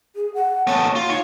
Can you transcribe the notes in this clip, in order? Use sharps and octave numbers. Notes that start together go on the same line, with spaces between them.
G#4
F#5
A3 B3 C#5
F4
D#4 C#5